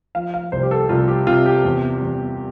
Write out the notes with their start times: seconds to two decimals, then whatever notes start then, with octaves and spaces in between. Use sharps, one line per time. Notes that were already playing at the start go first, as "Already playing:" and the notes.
0.15 F3 F5
0.34 F5
0.52 C2 C5
0.63 G4
0.71 A4
0.89 C2 F4
1.08 G4
1.27 C3 F4
1.46 G4
1.64 E2
2.02 E2